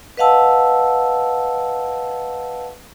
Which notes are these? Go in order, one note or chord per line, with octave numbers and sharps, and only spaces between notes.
B4 D#5 F5 F#5 A5 E6